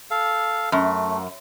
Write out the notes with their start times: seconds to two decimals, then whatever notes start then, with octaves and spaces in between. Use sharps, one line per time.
0.11 A4 F5
0.72 F#2 A3